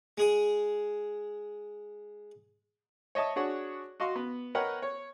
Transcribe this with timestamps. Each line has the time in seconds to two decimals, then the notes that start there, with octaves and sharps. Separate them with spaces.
0.18 G#3 G#4
3.15 C#5 D#5 E5 A5 D#6
3.36 D4 F#4 G#4 C#5 F#5
4.00 F#4 D#5 F5 C6 C#6
4.16 B3
4.55 A#4 B4 C#5 D#5 F#5 G5
4.82 C#5